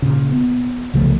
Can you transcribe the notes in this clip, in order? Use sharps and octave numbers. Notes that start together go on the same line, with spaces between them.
A#2 C#3
B3
C2 C#3 F3 A3